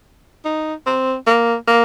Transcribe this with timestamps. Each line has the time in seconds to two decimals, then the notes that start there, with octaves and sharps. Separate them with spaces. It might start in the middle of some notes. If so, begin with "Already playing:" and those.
0.45 D#4
0.86 C4
1.27 A#3
1.68 A#3